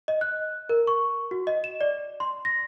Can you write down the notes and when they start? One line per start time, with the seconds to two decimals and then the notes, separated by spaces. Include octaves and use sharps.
0.08 D#5
0.21 F#6
0.69 A#4
0.87 C#6
1.31 F#4
1.47 D#5
1.64 E7
1.81 D5
2.20 C6
2.45 A#6